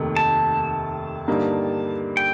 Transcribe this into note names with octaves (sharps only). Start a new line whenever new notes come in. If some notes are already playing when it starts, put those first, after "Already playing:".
Already playing: F1 D#2 D#3 A3
A5
G2 D3 G3 A#3 D#4
G5